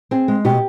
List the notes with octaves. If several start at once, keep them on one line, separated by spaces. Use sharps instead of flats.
C4 G#4
G#3
B2 G4